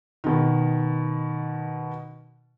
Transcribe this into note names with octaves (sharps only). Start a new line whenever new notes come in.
B2 D#3